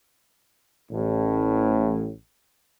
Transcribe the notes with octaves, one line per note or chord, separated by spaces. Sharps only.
A1 A2